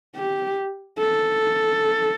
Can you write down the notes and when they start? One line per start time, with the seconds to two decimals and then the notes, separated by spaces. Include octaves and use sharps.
0.16 G4
0.99 A4